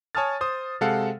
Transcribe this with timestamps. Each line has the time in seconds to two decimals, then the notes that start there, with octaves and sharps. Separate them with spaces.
0.15 C#5 G#5 A5 D#6 F6 A6
0.41 C5 D#6
0.81 C3 G#3 A4 F5 F#5